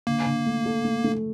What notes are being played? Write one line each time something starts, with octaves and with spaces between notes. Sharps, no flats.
D3 A#3
D3
A3
A4
A3
A3